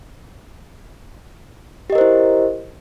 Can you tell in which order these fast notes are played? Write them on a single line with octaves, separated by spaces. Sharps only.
G4 D#5 A#4 C5 E4